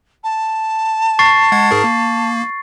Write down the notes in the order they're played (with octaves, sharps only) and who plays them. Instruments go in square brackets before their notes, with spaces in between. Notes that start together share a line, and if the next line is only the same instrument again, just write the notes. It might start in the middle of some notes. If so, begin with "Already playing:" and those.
[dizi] A5
[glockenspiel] C#6 A6 C7
[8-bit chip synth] G#3 F#5 G#6
G#2 G#4 A#4
A#3